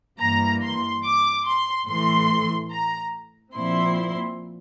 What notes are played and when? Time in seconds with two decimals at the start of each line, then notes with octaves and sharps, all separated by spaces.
0.19 G2 E3 A#3 A#5
0.61 C6
1.03 D6
1.45 C6
1.87 A2 E3 A3 C6
2.71 A#5
3.55 A#2 F3 C4 E4 C6